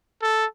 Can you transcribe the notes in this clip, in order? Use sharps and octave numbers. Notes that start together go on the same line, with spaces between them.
A4